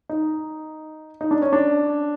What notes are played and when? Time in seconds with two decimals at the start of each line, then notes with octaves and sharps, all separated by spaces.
0.09 D#4
1.21 D#4
1.31 D4
1.42 C#4
1.53 D4